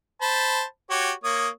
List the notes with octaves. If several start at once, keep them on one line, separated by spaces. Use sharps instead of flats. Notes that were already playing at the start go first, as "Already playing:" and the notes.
C5 A5 B5
F#4 G4 C#5
A#3 C#5 D#6